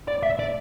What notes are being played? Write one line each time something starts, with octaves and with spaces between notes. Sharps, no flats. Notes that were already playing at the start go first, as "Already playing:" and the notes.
D5
E5
D5